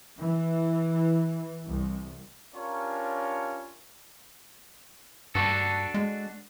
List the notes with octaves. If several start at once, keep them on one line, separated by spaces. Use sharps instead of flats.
E3
C2
C#4 D4 F4 G4 A#4 C#5
G2 D4 F#4 A4
G#3